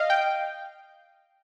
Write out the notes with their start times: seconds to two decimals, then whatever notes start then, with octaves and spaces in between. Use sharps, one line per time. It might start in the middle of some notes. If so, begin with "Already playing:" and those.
Already playing: D#5 F5
0.10 G5